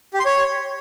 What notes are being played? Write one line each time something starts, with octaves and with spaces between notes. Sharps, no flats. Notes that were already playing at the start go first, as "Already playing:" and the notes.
G4
C6
C#5